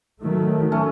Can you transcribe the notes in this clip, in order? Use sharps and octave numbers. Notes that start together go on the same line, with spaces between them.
D#3 F#3 A3
A3 C#4